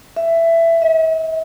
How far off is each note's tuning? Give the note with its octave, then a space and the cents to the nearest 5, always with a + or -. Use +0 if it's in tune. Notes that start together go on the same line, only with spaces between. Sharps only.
E5 +15
E5 -45